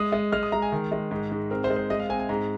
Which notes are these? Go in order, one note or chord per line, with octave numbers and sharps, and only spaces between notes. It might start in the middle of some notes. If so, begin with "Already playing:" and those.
Already playing: G#3 D#6
G#3
G#3 F6
D#6
G#3 A#5
G#5
D#3
G#3
G#2
G#2
C4 A#4
C5
G#3
C5
G#3 D#5
F5
C4 G#5
G#5
G#2 A#5